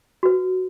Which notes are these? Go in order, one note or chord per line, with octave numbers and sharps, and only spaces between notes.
F#4 B4